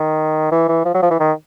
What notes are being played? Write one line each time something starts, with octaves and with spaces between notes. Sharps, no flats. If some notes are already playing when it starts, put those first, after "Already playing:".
Already playing: D#3
E3
E3
F3
F#3
F3
E3
D#3